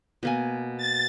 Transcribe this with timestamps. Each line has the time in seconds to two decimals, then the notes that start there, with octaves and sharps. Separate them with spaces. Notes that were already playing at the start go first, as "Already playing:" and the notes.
0.23 B2 A#3 G#5
0.78 A6